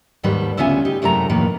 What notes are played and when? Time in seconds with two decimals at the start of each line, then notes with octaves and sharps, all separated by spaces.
0.23 D#2 G#2 D#3 G3 A4 B4
0.57 D2 C#3 B3 F4 E5 G#5
0.85 D#4 G4
1.02 F#2 C3 G#3 A3 E4 A#5
1.29 F2 A2 D#3 A#3 B4